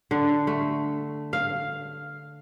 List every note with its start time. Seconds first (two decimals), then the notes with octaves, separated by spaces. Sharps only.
0.11 D3
0.47 A3
1.33 F5